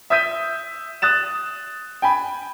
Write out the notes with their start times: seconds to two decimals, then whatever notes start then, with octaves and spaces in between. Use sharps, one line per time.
0.10 E5 D#6 E6 G6 B6 D#7
1.02 D#6 F#6 A6 E7
2.02 G5 G#5 B5